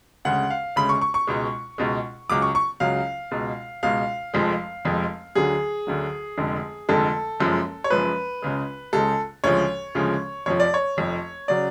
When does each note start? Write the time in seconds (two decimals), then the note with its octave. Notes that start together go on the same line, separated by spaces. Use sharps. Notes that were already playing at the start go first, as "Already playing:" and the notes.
0.25 D2 C#3 G#3 F#5
0.50 F5
0.76 D2 C#3 G#3 B5
0.89 C#6
1.01 C#6
1.14 C#6
1.27 C#2 B2 G#3
1.78 C#2 B2 G#3
2.30 C#2 C#3 F#3 D6
2.42 C#6
2.55 C#6
2.80 C#2 C#3 F#3 F5
3.31 C#2 B2 G#3
3.83 C#2 B2 G#3 F5
4.34 F1 F2 F3 G#3
4.85 F1 F2 F3 G#3
5.35 D2 D3 F#3 G#4
5.87 D2 D3 F#3
6.38 F1 F2 D3 G#3
6.89 F1 F2 D3 G#3 A4
7.40 F#1 F#2 F3 G#3
7.84 C#5
7.90 F#1 F#2 F3 G#3 B4
8.42 C#2 C#3 G#3
8.93 C#2 C#3 G#3 A4
9.44 D2 C#3 F3 G#3 C#5
9.95 D2 C#3 F3 G#3
10.46 F1 F2 F3 C#5
10.60 D5
10.74 C#5
10.97 F1 F2 F3
11.48 C#3 F#3 D5